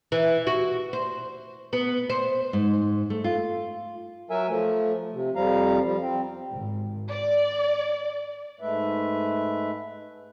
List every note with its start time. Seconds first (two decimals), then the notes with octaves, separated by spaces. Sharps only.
0.12 E3
0.47 F#4
0.93 C5
1.73 B3
2.10 C5
2.53 G#2
3.10 A3
3.24 F4
4.30 F#3 A#4 E5 G#5
4.49 F3 A3
5.14 C3
5.36 F2 F3 G3 F5 A#5
5.84 F3 G3
6.02 C4
6.53 G#1
7.12 D5
8.60 G#2 G#3 A3 B4 E5